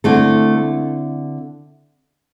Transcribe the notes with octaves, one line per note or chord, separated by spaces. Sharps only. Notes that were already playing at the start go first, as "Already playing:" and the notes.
D3 A3 C4 E4 A4